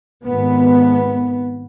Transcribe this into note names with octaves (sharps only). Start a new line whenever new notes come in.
G#1 B3